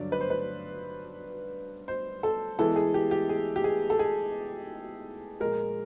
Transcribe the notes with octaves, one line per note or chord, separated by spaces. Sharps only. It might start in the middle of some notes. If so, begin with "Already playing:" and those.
Already playing: G2 D3 F#3 D5
B4
C5
B4
C5
A4
E3 G#3 B3 E4 A4
G#4
G4
G4
G#4
G4
G#4
A4
G#4
A#2 F3 G#3 A#4